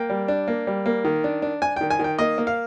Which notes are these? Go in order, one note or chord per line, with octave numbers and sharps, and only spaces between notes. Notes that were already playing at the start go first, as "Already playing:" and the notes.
Already playing: A#3 G5
G3
D4
A#3
G3
A#3
D#3
D4
D4
D4 G#5
D#3 G5
G#5
D#3 G5
A#3 D#5
A#3
F5